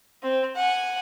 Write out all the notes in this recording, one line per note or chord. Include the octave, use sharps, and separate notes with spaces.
C4
F#5 G#5